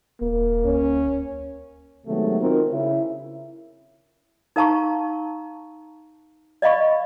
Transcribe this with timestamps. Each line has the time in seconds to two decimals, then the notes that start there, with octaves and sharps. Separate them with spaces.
0.21 D#1 A#3
0.65 D2 C#4
2.07 C3 D#3 F#3 G#3 A3 B3
2.40 C4 D#4 F4 F#4 A#4
2.71 C#3 E4
4.56 D#4 A#4 F5 A5 A#5 C#6
6.62 D5 D#5 F5 B5 C#6